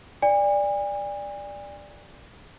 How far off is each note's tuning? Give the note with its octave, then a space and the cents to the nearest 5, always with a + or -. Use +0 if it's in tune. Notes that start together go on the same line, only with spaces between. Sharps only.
D5 +0 G#5 -40